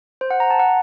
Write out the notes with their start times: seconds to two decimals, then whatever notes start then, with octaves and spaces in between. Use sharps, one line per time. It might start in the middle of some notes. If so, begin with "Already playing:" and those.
0.21 C5
0.31 F#5
0.40 A#5
0.50 A5
0.59 F#5